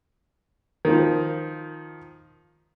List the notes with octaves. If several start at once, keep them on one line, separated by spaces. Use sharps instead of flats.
D#3 F3